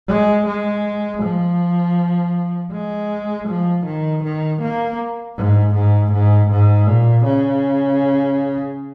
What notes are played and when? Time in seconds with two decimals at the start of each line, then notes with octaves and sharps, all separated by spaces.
0.08 G#3
0.46 G#3
1.22 F3
2.72 G#3
3.48 F3
3.86 D#3
4.23 D#3
4.61 A#3
5.36 G#2
5.74 G#2
6.12 G#2
6.50 G#2
6.87 A#2
7.25 C#3